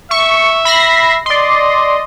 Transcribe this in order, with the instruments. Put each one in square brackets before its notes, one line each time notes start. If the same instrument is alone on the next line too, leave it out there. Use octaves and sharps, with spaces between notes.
[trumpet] E5 [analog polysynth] C#6
[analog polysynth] B5 A#6 C7
[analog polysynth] D5 C6 [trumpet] D#5